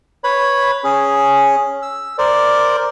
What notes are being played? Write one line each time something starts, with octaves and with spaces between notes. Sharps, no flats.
B4 C#5 B5
C#4 G#4
E6
A#4 C5 D5